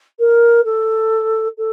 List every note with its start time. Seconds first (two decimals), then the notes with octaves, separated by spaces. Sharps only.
0.19 A#4
0.65 A4
1.58 A4